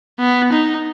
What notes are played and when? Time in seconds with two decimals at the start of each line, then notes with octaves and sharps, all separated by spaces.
0.20 B3
0.52 D#4